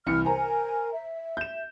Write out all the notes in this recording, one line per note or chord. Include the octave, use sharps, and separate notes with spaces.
C2 E3 F6 C#7
A#4 C5 G#5 A#5
E5
G6 E7